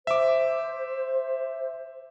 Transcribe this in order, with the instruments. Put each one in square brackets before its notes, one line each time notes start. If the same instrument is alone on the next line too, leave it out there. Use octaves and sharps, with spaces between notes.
[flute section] C5 [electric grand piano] E5 D6